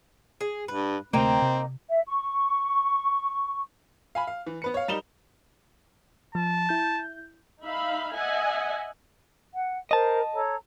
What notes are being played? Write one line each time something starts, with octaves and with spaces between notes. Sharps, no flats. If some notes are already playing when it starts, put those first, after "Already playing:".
G#4
G2 B4
D2 C3 A3 A#3 C4 D#4 G5
C3
E5
C#6
F5 G#5 B5
F5
E3
B3 B4 C#7
C#5 F5
G3 D#4 A#4 E7 F7 G7
F3 A5
E4 G6
D#4 E5 F5 B5
D#5 E5 F#5 G#5
F#5
A#4 C5 D#5 A5
A4 C#5 A#5